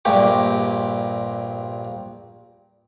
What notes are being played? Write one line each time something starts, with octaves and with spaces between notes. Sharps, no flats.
A#1 G2 A#2 G4 C#6